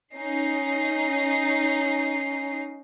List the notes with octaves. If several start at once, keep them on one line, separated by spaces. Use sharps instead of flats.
C#4 D#4 C7